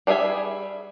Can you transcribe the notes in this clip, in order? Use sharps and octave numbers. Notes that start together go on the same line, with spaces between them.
G3 D4 G#4 E5 G#5